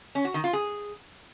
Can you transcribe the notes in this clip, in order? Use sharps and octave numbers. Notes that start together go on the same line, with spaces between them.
C#4
F#4
D#3
F4
G#4